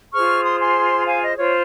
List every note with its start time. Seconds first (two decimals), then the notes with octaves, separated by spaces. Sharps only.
0.13 F4 G#4 C5 C#6 F6
0.44 C6 D#6
0.60 G#5 C6
1.06 F5 G#5
1.21 D#5
1.37 F4 C5 C#5